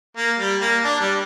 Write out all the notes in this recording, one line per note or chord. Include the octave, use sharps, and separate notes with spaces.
A#3
G3
A#3
D4
G3